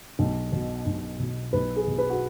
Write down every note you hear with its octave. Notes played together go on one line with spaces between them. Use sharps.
B1
B2
B1
B2
B1 B4
G#4
B2
B4
F#4